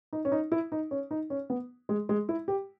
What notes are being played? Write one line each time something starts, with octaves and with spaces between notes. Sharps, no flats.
D#4
C#4
D#4
E4
D#4
C#4
D#4
C#4
B3
G#3
G#3
E4
G4